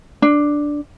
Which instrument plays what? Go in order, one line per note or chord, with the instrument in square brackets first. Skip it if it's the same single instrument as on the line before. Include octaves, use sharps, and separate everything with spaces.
[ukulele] D4